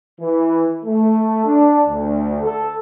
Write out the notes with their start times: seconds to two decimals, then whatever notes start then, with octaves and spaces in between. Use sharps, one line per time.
0.20 E3
0.85 A3
1.45 D4
1.87 D2
2.42 A4